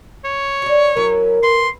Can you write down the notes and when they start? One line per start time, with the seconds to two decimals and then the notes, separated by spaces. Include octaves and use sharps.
0.24 C#5
0.62 F#4 D5
0.97 F#3 C#4 E4 A#4
1.43 B4 C6